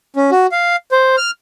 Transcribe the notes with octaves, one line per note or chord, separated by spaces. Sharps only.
C#4
F#4
F5
C5
F6